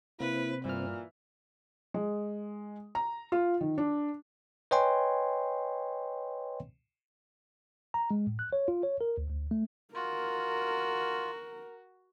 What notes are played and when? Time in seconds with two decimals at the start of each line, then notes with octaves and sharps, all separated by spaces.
0.20 C3 A#3 C4 E4 B4
0.65 G2 A#2 E3 F6
1.94 G#3
2.95 A#5
3.32 F4
3.61 D#3
3.78 D4
4.71 B4 C#5 D#5 G5 G#5 C6
7.94 A#5
8.11 G#3
8.27 A2
8.39 F#6
8.53 C#5
8.68 F4
8.83 C#5
9.01 A#4
9.18 D2
9.29 D2
9.51 A3
9.94 F4 F#4 A#4